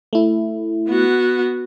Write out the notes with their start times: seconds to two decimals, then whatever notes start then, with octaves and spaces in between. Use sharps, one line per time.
0.13 A3 E4
0.89 B3 F#4